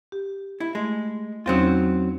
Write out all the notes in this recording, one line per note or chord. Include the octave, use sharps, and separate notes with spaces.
G4
E4
G#3 A3
E2 F#3 C4 C#4 D#4 F4